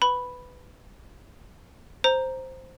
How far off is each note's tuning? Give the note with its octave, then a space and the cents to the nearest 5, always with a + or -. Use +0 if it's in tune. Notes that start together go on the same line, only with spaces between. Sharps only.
B4 +10 B5 +0
C5 +0 A#5 +0